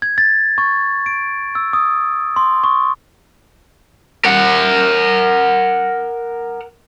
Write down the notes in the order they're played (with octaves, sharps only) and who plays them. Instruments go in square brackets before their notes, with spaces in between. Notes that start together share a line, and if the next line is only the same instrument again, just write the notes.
[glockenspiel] G#6
A6
C#6
D7
E6
D#6
C6
C#6
[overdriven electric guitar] A#4 F#5